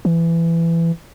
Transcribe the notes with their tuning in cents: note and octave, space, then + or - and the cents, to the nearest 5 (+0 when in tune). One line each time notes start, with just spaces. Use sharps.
E3 +20